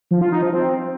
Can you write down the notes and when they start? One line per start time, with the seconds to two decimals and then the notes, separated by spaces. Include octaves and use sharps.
0.11 F3
0.21 F4
0.32 D#4
0.43 F3
0.53 C4